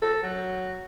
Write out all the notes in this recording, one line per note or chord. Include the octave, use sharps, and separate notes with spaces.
A4
F#3